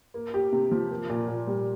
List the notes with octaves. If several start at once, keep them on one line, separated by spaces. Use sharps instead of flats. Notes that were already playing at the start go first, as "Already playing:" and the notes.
A#3
G4
C3
F3
A#3
A#2
A#2
G3